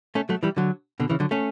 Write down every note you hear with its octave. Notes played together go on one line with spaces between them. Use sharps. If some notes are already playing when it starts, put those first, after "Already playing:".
A3 C#4
F#3 A3
E3 G3
D3 F#3
B2 D3
C#3 E3
D3 F#3
A3 C#4